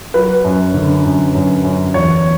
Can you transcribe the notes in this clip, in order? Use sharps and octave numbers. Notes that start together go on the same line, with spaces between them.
F#3 B4
F#2
D3
F#2
F#2
F#2
E2 C#5